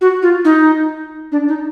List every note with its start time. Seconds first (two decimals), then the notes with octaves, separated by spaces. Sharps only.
0.01 F#4
0.22 F4
0.45 D#4
1.32 D4
1.48 D#4